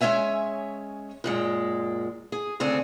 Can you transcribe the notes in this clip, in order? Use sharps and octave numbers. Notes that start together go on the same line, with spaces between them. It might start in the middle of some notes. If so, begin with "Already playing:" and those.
G#3 C#4 C#5 E5 G#5
F#2 A#2 G#3
G#4
D2 C#3 C4 D4 A4 G#5